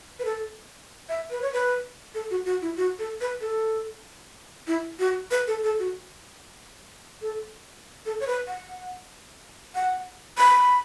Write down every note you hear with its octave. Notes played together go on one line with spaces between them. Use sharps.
B4
A4
E5
B4
C#5
B4
A4
F#4
F#4
E4
F#4
A4
B4
A4
E4
F#4
B4
A4
A4
F#4
A4
A4
C#5
B4
F#5
F#5
B5